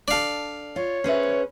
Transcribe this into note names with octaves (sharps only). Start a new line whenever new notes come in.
D4 A4 D5 F5
F4 C#5
C#4 G#4 B4 C5 E5